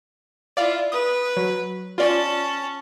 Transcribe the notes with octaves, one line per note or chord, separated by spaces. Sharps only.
E4 F4 D5 F5
B4 D#6
F#3
C#4 F4 D5 A5